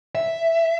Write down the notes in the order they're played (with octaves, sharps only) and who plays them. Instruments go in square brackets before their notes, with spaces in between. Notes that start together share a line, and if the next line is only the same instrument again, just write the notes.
[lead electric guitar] E5